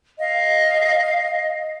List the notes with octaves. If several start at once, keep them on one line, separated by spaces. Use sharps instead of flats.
D#5 F5